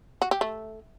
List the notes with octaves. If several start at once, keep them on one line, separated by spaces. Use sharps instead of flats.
F#4
G4
A3